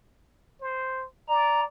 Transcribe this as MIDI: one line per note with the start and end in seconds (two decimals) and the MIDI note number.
0.61 1.06 72
1.29 1.66 74
1.29 1.61 82